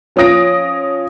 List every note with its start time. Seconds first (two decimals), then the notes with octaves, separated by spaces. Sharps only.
0.16 F3 C#4 F4 D#6 A#6 D7